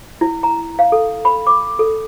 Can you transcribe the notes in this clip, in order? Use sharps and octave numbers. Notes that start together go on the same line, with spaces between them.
E4
A#5
F5
A4
B5
D6
A4